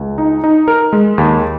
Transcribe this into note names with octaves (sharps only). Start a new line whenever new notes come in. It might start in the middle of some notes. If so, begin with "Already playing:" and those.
Already playing: C#2
D#4
D#4
A#4
G#3
D#2